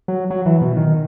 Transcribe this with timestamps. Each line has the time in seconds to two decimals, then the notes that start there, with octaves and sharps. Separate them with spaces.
0.08 F#3
0.31 F#3
0.46 E3
0.61 B2
0.77 D#3